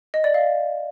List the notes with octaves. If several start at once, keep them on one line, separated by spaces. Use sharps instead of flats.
D#5
D5
F5